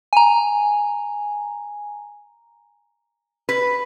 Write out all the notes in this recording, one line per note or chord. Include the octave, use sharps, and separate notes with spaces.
G#5 A#5
B4